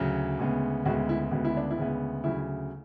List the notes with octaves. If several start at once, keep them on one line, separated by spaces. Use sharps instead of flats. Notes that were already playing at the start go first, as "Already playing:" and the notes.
Already playing: D2 C#3 F#3
D2 C#3 G#3 B3
D2 C#3 G#3 B3 F#4
E4
D2 C#3 G#3 B3 F#4
E4
D4
E4
D2 C#3 G#3 B3
D2 C#3 F#3 E4